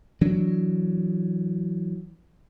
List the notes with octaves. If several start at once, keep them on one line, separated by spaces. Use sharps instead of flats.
E3 F#3 D4